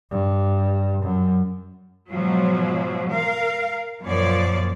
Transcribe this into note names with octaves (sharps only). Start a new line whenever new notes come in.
G2
F#2
G#2 B2 F3 F#3
A#4 F5
F#2 A#2 F3 C#5 D5